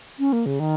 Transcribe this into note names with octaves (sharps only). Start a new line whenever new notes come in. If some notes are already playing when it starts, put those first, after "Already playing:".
C#4
A#3
C#3
D#3